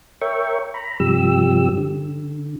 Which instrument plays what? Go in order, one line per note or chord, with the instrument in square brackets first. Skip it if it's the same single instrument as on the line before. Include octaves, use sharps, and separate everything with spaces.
[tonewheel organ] A#4 C#5 E5 G5 C#6
A#5 B5
G2 C3 F3 G3 G4 E6
D3